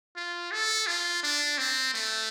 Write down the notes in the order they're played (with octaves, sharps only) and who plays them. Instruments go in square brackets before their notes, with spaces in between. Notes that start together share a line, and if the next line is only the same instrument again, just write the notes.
[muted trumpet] F4
A4
F4
D4
C4
A3